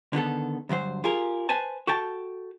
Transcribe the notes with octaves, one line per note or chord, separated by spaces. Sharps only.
D3 D#3 B3 A4
D2 G2 F#3 C5
F4 G4 G#4 A#4
B4 C5 G#5 A5
F#4 A4 G5 A5